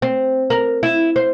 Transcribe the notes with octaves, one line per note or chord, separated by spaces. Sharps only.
C4
A#4
E4
C5